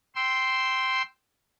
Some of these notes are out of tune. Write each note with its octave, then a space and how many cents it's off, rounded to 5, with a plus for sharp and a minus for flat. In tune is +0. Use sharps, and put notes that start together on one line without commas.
G5 -10 C6 +0 E6 +0